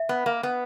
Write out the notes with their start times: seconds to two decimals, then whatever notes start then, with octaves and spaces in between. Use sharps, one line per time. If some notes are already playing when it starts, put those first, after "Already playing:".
Already playing: E5
0.09 B3
0.26 A#3
0.43 B3